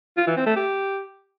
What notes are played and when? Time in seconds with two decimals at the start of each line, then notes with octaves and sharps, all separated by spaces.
0.17 F4
0.27 E3
0.37 C4
0.46 A3
0.56 G4